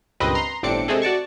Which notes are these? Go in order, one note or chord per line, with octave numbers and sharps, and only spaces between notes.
C#2 G2 A#2 C4 B4 D#5
A#5 C6
G1 A2 C4 D4 D6 C#7
C3 G#3 A3 C4 G#4 A4
F#4 D5 A5 C#6